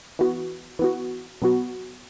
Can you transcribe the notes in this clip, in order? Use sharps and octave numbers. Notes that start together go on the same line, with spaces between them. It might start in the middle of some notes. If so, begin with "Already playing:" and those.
E3 B3 F#4
E3 B3 F#4
B2 F#3 B3 F#4